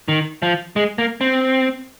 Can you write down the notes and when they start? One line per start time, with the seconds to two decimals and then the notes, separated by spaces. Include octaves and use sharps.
0.08 D#3
0.42 F3
0.76 G#3
0.98 A#3
1.21 C4